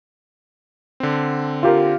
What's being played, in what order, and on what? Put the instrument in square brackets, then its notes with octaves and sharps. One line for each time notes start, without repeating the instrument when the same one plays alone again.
[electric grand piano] D3 C4
[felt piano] F4 G4 A#4